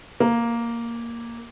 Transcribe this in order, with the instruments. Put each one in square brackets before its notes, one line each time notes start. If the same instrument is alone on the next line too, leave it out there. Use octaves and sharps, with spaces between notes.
[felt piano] A#3